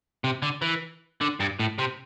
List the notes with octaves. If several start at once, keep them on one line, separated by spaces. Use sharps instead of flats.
C3
D3
E3
D3
G2
A2
C3